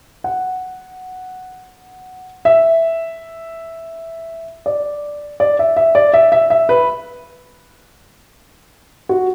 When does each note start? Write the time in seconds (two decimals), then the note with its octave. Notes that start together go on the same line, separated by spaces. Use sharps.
0.24 F#5
2.45 E5
4.66 D5
5.40 D5
5.59 E5
5.77 E5
5.95 D5
6.14 E5
6.32 E5
6.50 E5
6.69 B4
9.09 F#4